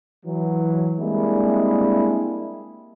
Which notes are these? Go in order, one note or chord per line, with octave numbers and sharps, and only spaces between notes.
E3 F#3
G3 G#3 A#3 C4 D4 E4